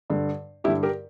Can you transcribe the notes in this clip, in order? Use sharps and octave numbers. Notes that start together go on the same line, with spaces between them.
G2 D3
G2 D3 E4 G4
G4 A#4